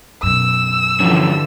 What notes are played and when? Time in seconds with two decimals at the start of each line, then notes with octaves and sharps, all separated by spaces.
0.23 F#2 B2 E6
1.00 G2 D3 E3 F3 C#4